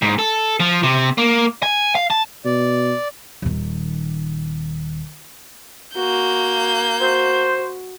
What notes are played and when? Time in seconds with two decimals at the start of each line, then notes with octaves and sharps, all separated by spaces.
0.02 G#2
0.19 A4
0.60 F3
0.83 C3
1.18 A#3
1.63 G#5
1.95 F5
2.10 A5
2.45 B2 D5
3.42 D#1 D#3
5.95 A#3 F#4 G6
7.01 F#4 C5